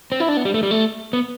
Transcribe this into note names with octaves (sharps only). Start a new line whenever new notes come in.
C4
E4
D4
B3
G3
A3
G3
A3
B3